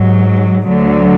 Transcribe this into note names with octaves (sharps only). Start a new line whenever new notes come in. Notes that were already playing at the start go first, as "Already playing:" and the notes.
Already playing: G#2 F#3
D2 D3 F#3